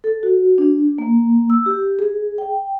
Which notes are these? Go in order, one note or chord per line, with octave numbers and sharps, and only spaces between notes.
A4
F#4
D4
A#3
E6
G4
G#4
G5